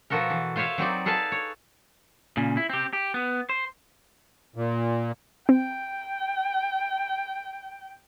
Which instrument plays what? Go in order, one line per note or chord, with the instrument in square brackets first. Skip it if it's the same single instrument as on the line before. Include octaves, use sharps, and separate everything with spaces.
[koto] B2 F3 F#4 A4 A#4
E3
F4 C5 C#5 E5 F5
F#3 C4 D#4 D5
G#4 A4 B4 F5 A5
C#5
[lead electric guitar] A#2 C#3
E4
C4 G4
G4
B3
C5
[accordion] A#2
[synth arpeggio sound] C4 [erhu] G5